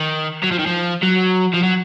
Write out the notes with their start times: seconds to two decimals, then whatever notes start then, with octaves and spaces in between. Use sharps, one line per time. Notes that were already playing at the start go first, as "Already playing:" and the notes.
Already playing: D#3
0.44 F#3
0.52 F3
0.59 D#3
0.67 F3
1.03 F#3
1.54 F3
1.63 F#3